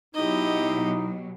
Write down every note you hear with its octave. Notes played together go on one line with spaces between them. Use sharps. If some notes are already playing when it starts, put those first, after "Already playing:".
B2 F#3 D#4 E4 G4 D#5